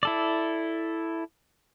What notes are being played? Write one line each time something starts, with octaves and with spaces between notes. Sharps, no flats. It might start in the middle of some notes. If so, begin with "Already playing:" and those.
E4 A4 D5